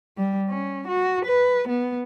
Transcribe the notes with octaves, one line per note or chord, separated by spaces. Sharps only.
G3
C#4
F#4
B4
B3